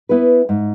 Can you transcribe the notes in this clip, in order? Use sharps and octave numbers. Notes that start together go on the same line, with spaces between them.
B3 E4 B4
G#2